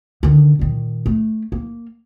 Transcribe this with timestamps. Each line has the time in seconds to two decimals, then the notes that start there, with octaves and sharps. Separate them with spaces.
0.23 D3 D#3
0.59 A#2 D#3
1.06 A3
1.52 A#3